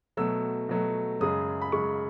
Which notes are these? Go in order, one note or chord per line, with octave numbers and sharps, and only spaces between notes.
B2 F#3 A3 E6
B2 F#3 A3
F#2 C#3 G#3 D#6
B5
F#2 C#3 G#3 C#6